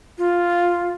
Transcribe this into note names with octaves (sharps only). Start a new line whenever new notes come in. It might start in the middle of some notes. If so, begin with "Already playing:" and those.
F4